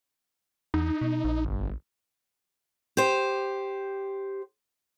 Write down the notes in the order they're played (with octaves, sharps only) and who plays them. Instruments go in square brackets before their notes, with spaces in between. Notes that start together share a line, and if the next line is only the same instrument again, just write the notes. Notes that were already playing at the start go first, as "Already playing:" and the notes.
[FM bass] E2 [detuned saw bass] D#4
[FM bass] B2
A#1
[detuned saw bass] G1
[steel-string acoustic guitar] G4 C5